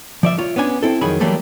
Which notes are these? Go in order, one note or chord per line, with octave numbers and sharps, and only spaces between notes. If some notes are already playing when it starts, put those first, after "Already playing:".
F3 D5 E5
F4 C#5
B3 C#4 D4 G#5
C4 E4 A4
F2 D#3 F#3 G#4 B5
E3 F#3 G3 A3 A#3 A4